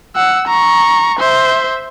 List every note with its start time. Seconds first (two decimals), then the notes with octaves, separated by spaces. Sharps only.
0.16 F#5 E6
0.47 A#5 C#6
1.19 C5 E5